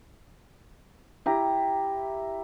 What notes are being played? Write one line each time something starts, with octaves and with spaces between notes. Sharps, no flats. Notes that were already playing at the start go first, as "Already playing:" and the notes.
E4 G4 A#5